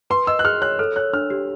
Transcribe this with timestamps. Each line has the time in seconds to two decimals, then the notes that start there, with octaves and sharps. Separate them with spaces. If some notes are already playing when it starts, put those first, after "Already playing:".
0.10 B4 C6
0.27 D#5 E6
0.39 F#6
0.45 G#4 F6
0.61 C#5 F#6
0.79 A4 F6
0.96 C#5 F#6
1.13 D4 F6
1.30 G4